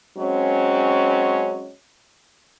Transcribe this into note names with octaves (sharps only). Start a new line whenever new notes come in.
F#3 G#3 C4 C#4